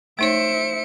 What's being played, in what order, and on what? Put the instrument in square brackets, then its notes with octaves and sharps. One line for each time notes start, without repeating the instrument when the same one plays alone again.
[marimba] A3 D#4 C#5 [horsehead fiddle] C5 E5 [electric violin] C#7 D7